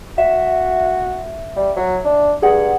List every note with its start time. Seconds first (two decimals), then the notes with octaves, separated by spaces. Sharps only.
0.18 F#4 E5
1.56 G3
1.76 F#3
2.05 D4
2.42 G2 G#4 F#5